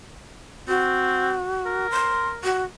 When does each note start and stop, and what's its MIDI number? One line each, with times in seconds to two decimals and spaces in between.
0.68 1.36 60
0.68 1.87 66
1.66 2.45 70
1.91 2.28 84
2.44 2.63 66